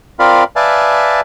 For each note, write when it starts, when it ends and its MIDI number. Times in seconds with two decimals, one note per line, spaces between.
0.20 0.44 60
0.20 0.44 65
0.20 0.44 70
0.20 0.44 74
0.20 0.44 77
0.20 0.44 83
0.56 1.21 71
0.56 1.21 74
0.56 1.21 76
0.56 1.21 77
0.56 1.21 80
0.56 1.21 81